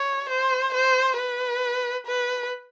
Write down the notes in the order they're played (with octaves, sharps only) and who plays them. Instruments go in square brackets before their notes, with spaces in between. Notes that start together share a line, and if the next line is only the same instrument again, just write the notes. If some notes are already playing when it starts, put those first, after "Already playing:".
Already playing: [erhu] C#5
C5
C5
B4
B4